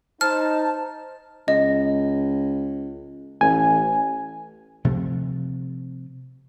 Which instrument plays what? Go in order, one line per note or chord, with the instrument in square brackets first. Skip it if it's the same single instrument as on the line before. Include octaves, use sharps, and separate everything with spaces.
[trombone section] D#4 [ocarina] C5 [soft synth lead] A5 [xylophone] F6
[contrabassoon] C#2 [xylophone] D#5
[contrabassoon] A1 [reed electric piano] G#5
[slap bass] C3 F3 A3